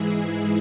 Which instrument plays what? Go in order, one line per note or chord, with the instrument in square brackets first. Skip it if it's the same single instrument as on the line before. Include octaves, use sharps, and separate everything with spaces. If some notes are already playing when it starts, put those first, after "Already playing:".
Already playing: [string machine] G#2 E3 G#3 E4 G#4